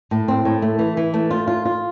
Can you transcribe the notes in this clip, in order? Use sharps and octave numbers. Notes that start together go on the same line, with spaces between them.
A2
C4
A2
A3
E3
E3
A3
F4
F4
F4